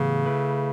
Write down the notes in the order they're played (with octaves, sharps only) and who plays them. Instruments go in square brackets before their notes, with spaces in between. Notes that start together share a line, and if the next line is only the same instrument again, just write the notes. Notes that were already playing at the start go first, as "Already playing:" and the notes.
Already playing: [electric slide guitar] A2 E3 B3 G4 [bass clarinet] C#3
[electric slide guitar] A3 E4 B4